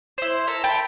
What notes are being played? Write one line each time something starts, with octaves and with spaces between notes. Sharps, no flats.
E4 C5
A4 A#4 E5
G5 A5 B5